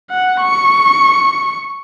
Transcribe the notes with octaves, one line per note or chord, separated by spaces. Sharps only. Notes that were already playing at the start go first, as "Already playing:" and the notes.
F#5
C#6